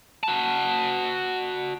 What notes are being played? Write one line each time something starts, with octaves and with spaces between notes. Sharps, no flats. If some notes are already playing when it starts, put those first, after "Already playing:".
F#4 A5